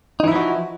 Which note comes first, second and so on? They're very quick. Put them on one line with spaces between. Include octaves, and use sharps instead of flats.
D#4 E3 E4 F3 F#4